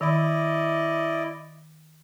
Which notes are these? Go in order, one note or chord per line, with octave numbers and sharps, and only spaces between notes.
D#3 E4 D5 D#5 B5